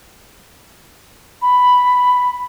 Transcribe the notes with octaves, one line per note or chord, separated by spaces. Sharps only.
B5